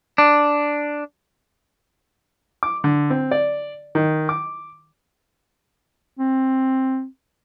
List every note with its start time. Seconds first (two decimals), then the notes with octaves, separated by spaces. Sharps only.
0.18 D4
2.63 D6
2.84 D3
3.10 C4
3.31 D5
3.95 D#3
4.29 D6
6.19 C4